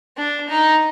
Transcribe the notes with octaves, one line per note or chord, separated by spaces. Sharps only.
D4
D#4